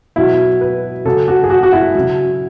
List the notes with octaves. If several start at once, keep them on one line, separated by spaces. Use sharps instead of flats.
B2 F#3 E4
B4
C#3 F#3 A4
F#4
G#4
F#4
F#4
E4
C#3 F#3